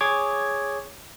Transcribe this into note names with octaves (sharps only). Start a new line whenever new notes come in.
G#4 C#5 D6 G#6